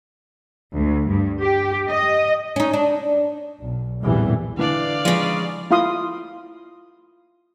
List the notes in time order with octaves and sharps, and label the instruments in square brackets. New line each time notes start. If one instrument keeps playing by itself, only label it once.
[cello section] D2
G2
G4
D#5
[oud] C#4 D#4
D4
[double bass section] B1
A#1 E2 A2 C3 E3 G3
[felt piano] D3 E3 D4 [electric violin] D5 F5
[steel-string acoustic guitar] C#3 G#3 [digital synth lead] F3
[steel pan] E4 F4 F5 C6 D#6